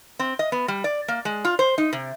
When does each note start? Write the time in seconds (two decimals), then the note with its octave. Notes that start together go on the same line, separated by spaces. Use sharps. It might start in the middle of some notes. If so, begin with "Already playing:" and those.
0.19 C4
0.39 D#5
0.52 B3
0.68 G3
0.84 D5
1.08 A#3
1.25 G#3
1.45 F4
1.59 C5
1.78 D#4
1.93 C3